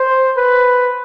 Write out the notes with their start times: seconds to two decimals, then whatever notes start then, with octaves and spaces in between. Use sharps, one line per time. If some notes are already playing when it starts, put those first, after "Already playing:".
Already playing: C5
0.37 B4